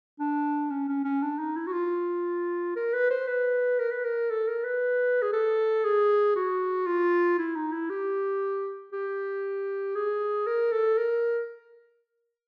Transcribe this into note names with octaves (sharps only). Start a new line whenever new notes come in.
D4
C#4
C#4
C#4
D4
D#4
E4
F#4
F4
A#4
B4
C5
B4
A#4
B4
A#4
A4
A#4
B4
G#4
A4
G#4
F#4
F4
E4
D#4
E4
G4
G4
G#4
A#4
A4
A#4